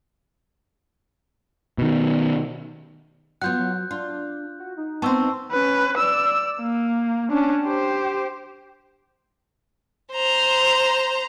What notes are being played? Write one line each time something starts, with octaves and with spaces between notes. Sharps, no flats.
B2 D#3
F#3 B3 F4 F#5 F#6 G6
F#3
D4 F4
F#4
D#4
B3 C4 A5 C#6 E6
C#4 B4
D5 E6
A#3
C#4 D4
G4 C5
C5 A#5